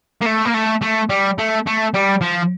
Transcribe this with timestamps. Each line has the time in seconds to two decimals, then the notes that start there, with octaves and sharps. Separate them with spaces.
0.22 A#3
0.26 A3
0.46 A#3
0.54 A3
0.82 A3
1.10 G3
1.38 A3
1.67 A3
1.94 G3
2.22 F3